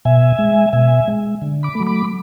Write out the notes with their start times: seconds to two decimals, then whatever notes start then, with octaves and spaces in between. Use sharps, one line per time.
0.05 B2 E5 G#5
0.39 G#3
0.73 B2 E5 G#5
1.08 G#3
1.41 D3
1.63 B5 D6
1.75 A3
1.80 F#3
1.86 B5 D6